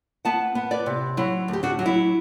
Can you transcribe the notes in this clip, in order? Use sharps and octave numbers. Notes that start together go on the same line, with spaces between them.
B3 F#5 A5
B3
B4 D5
C3
F#3 E4
D2
G4
D4 F#4
F#3
E4